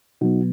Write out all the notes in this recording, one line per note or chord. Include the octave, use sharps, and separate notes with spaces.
B2 F#3 B3 D#4 F#4